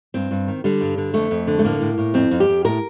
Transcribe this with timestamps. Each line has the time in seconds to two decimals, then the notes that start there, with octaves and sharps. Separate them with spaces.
0.14 G2 C4
0.31 G2
0.47 D#3
0.64 D3 G3
0.81 G2
0.98 D3
1.14 F2 A3
1.31 F2
1.47 D3
1.59 A3
1.64 A2 A#3
1.81 A2
1.98 A2
2.14 F2 C4
2.31 F2
2.40 G4
2.48 F2
2.64 A2 A#4